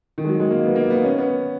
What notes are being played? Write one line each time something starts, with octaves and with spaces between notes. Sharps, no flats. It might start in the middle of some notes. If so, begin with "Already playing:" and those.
D#3
G#3
F#3
G#3
A#3
B3
A#3
B3
C#4
B3